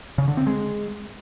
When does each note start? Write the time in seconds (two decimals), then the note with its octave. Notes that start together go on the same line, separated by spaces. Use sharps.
0.18 C#3
0.28 D3
0.37 C4
0.47 G#3